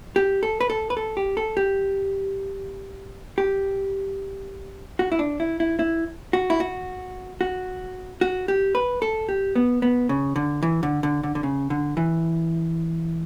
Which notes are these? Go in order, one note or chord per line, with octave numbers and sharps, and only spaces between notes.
G4
A4
B4
A4
B4
A4
G4
A4
G4
G4
F#4
E4
D4
E4
E4
E4
F#4
E4
F#4
F#4
F#4
G4
B4
A4
G4
B3
B3
C#3
D3
E3
D3
D3
D3
D3
C#3
D3
E3